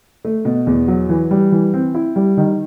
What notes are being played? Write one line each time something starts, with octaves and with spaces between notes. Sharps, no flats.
A3
B2
E2
F#3
E3
G3
E3
C4
E4
G3
D#3